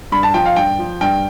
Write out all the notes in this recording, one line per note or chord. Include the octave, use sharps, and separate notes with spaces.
G2 B5
A5
F3 G5
F5
G2 G5
F3
G2 G5